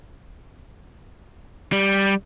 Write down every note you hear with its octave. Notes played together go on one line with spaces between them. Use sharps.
G3